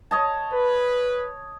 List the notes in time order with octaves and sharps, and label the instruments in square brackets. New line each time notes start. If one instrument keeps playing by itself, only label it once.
[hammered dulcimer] C#5 D#5 A5
[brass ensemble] B4